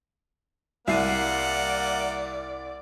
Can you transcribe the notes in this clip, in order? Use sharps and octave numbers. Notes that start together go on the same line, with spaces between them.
C2 A#3 D5 E5 F#5 C7 D#7